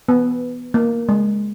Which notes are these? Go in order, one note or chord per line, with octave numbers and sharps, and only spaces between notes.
B3
A#3
G#3